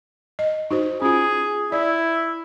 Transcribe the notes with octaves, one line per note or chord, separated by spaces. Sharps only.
D#5
D#4 F#4 C5
C#4 F4 G#4
E4 D5